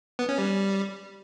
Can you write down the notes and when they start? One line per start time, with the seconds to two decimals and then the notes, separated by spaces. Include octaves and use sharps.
0.19 B3
0.29 C#4
0.38 G3